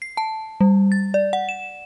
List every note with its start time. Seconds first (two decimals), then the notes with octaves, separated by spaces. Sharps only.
0.02 C7
0.17 A5
0.61 G3
0.92 A6
1.14 D5
1.33 F#5
1.49 E7